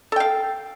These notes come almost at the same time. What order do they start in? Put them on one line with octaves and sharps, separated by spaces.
A4 G5 F5